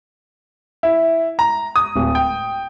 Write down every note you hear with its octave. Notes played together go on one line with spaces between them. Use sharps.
E4
A#5
D#6
D1
G5